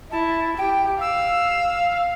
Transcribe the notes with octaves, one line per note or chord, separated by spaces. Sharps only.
E4 A5
G4 G5
F5 E6